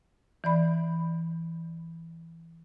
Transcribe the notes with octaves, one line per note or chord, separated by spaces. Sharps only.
E3 D5 B5